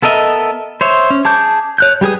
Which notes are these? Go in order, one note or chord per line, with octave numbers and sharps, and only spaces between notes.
B3 A4 A#4 D#5 E5
C5 C#5 E5
C#4
G#4 A5 D6 G6
C#5 F#6 G6
G3 G4 G#4 B4 D#6